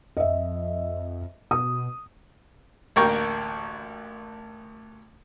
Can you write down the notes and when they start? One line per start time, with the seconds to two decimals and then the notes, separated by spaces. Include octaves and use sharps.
0.17 F2 D#5 E5
1.51 B2 D#6
2.96 A1 D2 A#3 G5 A#5 C#6